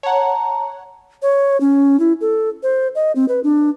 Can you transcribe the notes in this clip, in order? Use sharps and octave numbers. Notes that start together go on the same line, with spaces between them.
C#5 F#5 A5 A#5
C#5
C#4
E4
A4
C5
D#5
C4
B4
D4